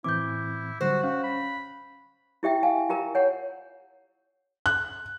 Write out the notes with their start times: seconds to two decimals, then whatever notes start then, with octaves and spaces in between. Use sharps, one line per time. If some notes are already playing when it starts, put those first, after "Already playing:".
0.04 A2 E3 C4 E4 D6 G6
0.81 D3 F#3 G3 F#4 C5
1.04 C#4 F#4 F5
1.23 B5
2.43 E4 G4 E5 G5
2.63 F5 G#5
2.89 F4 G4 A#4 A#5
3.15 C#5 F#5
4.66 F#6